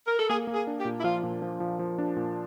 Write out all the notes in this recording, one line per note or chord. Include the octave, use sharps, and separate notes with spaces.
A#4
A4
A#3 G#4
A#3
G#4
D4
G4
A#2
E4
F3 F4
A#2
F3
F3
F3
D4
A#2